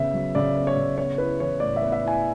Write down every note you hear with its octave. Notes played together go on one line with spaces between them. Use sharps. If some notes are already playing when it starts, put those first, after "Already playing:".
Already playing: C#3 B3 E5
F#3
C#3 D5
B3
C#5
C#3
B3 C#5
E4 B4
E3 C#5
A2 D5
E5
B3
E5
E4 G#5